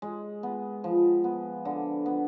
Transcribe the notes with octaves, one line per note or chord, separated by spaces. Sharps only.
G#3
B3
F3
B3
D3
B3